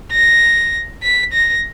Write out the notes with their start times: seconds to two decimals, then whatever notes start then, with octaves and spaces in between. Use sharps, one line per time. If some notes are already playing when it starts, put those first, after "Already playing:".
0.12 A#6
1.03 B6
1.33 A#6